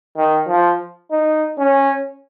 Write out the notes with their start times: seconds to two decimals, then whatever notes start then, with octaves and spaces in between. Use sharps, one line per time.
0.16 D#3
0.48 F3
1.11 D#4
1.58 C#4